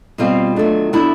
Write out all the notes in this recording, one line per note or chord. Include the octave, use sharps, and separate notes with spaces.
B2 G3 C4 F4
D#3 F#3 A3 D4
D3 F#3 B3 D4 E4